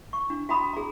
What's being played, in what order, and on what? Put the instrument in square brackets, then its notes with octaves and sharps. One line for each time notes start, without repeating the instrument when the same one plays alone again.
[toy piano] C#6
D4
F#4 G5 A#5 B5 D#6
G#4 A#5